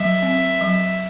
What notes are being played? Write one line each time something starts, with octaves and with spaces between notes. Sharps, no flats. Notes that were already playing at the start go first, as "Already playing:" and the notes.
Already playing: F#3 E5
C4
F#3